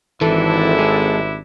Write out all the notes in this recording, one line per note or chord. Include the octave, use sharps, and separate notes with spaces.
G#1 C3 E3 D4 E4 A4
G#3